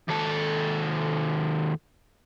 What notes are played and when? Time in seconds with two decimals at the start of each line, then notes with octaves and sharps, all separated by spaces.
0.09 D#2 A4